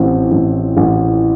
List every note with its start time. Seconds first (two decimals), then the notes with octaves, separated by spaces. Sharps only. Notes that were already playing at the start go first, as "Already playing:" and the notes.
Already playing: A1 A2 C4
0.32 A1
0.77 A1